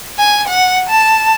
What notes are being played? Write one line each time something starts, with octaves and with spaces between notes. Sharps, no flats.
G#5
F#5
A5